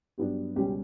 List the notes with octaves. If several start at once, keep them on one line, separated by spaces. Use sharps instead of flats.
G2 F#3 B3 D4 G4
C#2 B2 G3 C#4 G4